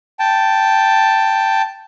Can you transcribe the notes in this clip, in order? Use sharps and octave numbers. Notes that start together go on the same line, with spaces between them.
G5 A5